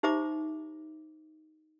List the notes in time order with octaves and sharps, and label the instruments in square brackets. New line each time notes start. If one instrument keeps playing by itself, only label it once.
[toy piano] D#4 G4 C5 E5 A#5 D6